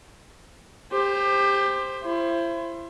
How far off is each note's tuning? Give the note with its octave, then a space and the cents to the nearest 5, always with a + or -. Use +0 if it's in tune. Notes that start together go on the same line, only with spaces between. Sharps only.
G4 +25 C5 +0
E4 +35 C5 +25